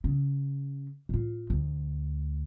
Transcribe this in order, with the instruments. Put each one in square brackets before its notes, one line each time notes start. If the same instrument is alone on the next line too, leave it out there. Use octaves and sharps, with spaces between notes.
[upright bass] C#3
A2 F4
D2